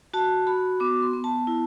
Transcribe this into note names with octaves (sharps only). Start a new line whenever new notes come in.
F#4 A5
F#4 B5
B3 D6
C6
B3
A5
E4